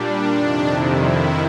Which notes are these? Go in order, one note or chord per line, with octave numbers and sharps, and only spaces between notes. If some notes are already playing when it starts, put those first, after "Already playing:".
Already playing: A#2 G3 D4
F2 C3 D#3 D4
E4
E4